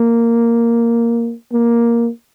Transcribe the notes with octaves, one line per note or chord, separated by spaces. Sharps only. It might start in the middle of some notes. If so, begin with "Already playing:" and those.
Already playing: A#3
A#3